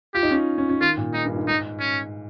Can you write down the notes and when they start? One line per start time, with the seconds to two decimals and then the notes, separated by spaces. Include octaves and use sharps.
0.14 F4 G4
0.23 D#4
0.31 C#4
0.58 C#4
0.69 C#4
0.81 D#3 F4
0.97 A#2
1.14 G#2 D#4
1.25 G2
1.36 G#2
1.47 G#2 D#4
1.80 C#4